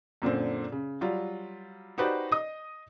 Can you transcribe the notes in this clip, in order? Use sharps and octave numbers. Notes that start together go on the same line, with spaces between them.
F#2 A#2 D3 C4
C#3
F#3 G3 F4
D#4 F#4 G4 B4 C5 D5
D#5 D#6